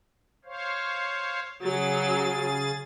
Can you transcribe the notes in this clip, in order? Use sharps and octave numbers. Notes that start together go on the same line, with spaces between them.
C5 C#5 F5
C#3 F#3 G#4 A6